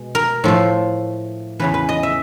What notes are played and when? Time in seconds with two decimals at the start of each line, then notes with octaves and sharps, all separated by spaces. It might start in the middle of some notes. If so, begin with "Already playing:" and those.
Already playing: B2 G#3
0.15 A#4
0.44 A2 F3 A3
1.59 E2 C#3 E3 B4
1.74 B4
1.89 D#5
2.03 E5